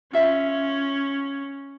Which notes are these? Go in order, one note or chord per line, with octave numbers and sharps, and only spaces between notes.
C#4 F4 E5 F5